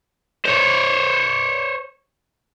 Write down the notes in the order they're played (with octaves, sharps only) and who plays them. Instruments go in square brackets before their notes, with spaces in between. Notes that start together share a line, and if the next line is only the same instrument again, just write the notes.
[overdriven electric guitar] C5 C#5